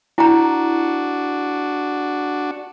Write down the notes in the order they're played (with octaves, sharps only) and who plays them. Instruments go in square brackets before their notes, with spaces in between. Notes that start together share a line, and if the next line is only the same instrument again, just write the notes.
[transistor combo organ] D4 F#4 [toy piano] E4 A#5